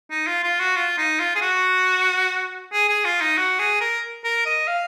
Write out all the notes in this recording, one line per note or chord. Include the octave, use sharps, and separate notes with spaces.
D#4
F4
F4
F#4
F4
D#4
F4
G#4
F#4
G#4
G#4
F4
D#4
F#4
G#4
A#4
A#4
D#5
F5